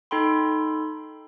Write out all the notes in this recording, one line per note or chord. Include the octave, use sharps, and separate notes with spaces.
D#4 A4 G5 B5 C6